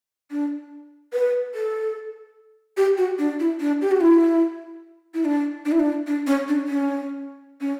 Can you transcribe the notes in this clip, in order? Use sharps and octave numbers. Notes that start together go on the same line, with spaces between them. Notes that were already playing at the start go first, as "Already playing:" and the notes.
D4
B4
A4
G4
F#4
D4
E4
D4
G4
F#4
E4
E4
D4
D4
E4
D4
D4
C#4
D4
C#4
C#4